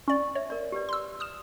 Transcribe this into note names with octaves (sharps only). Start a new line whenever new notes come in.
C#4 D5 C#6
C#5 E5
A#4 D5
G4 B4 D5
C6 E6
D#6 F6 E7